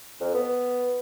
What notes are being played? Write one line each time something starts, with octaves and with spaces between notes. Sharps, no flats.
F2
B3